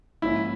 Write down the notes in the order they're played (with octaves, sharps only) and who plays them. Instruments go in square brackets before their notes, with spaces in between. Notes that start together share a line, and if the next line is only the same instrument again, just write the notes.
[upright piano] G#2 F3 A#3 C#4 [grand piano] E4